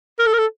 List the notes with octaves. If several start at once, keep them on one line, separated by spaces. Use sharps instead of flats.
A#4
A4
A#4
A4